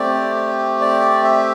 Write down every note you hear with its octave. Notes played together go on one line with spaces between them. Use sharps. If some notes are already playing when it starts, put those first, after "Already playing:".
Already playing: A3 C4 G4 D5
D5
E5